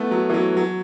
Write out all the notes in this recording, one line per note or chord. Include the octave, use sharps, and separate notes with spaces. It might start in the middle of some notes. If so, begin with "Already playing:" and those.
Already playing: A3 B3 E4
F#3
E3
F#3
F#3